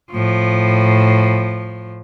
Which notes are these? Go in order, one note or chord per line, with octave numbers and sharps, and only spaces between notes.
A2 F3